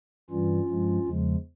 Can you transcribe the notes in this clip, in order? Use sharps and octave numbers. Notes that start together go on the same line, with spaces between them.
G2 E3 G3 C#4 F4
G2 F3 G#3
E2 C#3 F3 G#3